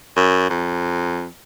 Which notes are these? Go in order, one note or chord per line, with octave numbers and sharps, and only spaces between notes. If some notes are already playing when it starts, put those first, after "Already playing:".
F#2
F2